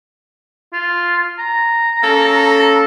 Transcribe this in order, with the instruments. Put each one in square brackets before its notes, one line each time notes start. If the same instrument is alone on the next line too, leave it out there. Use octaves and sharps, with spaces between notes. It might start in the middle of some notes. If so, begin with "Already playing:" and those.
[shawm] F4
A#5
[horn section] A#3 C#4 A4